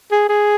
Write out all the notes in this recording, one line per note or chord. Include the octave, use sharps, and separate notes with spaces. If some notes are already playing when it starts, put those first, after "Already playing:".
G#4
G#4